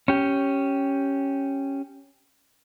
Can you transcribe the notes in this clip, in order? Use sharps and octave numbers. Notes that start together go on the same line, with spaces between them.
C#4 G4